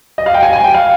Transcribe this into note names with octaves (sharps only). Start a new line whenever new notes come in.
D#5
F5
G5
G#5
G#5
G5
F5